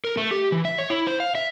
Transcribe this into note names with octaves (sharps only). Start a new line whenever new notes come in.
A#4
A3
G4
E3
E5
C#5
E4
C5
F5
E5